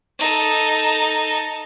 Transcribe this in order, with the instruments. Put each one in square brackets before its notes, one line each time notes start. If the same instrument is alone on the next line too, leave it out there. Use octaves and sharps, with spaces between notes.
[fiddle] D#4 A4